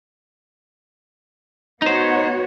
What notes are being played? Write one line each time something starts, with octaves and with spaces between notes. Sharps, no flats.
B3 D#4 F#4 C5 C#5